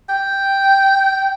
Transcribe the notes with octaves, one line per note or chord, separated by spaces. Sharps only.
G5